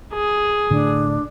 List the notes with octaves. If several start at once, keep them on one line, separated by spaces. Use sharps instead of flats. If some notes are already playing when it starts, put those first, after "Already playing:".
G#4
A2 D3 D4